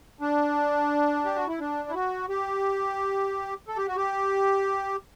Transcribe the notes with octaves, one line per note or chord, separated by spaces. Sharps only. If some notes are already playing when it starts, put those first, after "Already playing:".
D4
G4
F#4
E4
D4
E4
F#4
G4
A4
G4
F#4
G4